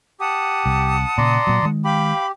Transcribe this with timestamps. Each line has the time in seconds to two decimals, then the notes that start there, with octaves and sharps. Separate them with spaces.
0.20 G4 F#5 A5 D#6
0.66 C2
1.18 A#2 C#3 D5 A#5 C6
1.47 A#2 F#3
1.63 D#3 G#3
1.84 G4 F5 G5 B5